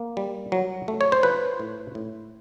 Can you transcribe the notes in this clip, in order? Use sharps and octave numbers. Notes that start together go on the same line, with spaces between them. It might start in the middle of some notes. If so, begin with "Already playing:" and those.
Already playing: A#3
G3
F#3
A3
C#5
C5
F3 B4
A2
A2